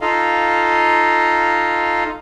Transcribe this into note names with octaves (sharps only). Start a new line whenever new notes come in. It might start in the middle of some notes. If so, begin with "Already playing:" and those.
D#4 F4 A4 D#5 F5